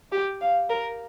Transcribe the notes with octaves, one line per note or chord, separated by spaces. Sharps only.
G4
F5
A#4